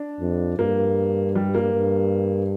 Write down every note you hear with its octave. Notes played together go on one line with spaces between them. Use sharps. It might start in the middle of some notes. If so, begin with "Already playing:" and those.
Already playing: D4
F2
G2 A#3
G3
A#3
G2